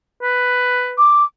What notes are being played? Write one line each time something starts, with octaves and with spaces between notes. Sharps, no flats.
B4
D6